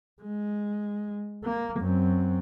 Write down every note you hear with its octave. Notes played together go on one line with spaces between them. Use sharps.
G#3
A#3
F#2 C4